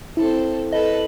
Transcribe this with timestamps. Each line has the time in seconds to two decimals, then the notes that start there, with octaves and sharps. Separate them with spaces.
0.17 C4 E4 A4
0.73 A4 B4 D#5